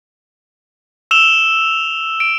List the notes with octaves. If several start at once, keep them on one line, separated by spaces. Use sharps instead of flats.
E6 E7 F7 G7
D7